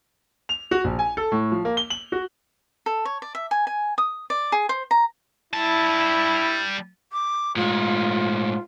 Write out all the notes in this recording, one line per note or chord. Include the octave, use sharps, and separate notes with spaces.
F7
F#4
A#1
G#5
A4
A2
F3
A#3
G7
F#7
F#4
A4
C#5
D5
E5
G#5
G#5
D#6
D5
G#4
C5
A#5
G3 E4 A5
D6
A2 G#3 F4